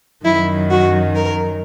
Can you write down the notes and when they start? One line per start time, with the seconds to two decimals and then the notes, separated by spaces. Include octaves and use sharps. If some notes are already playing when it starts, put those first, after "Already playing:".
0.24 F#2 D#3 F#3 E4
0.69 F#4
1.14 A#4